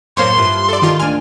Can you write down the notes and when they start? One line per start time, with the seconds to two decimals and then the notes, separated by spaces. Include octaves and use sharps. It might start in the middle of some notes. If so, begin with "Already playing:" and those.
0.17 F#2 A2 A#3 C5 C#5 C6
0.38 G2 F3 E4
0.69 A4 D5
0.82 D#3 F4
0.99 D2 D4 G#5 F6